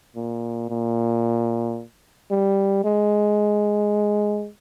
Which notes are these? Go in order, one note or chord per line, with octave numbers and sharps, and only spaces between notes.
A#2
A#2
G3
G#3